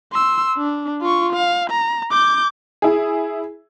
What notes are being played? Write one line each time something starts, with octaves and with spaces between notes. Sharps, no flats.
C6 E6
D4
F4 C#6
F5
A#5
D6 G6
E4 G#4